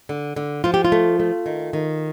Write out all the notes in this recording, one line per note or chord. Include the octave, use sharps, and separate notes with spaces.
D3
D3
F3 F4
G4
F4
A3
A3
D#3
D#3